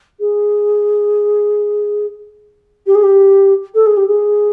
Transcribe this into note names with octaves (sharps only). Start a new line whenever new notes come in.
G#4
G4
G#4
G4
A4
G#4
G4
G#4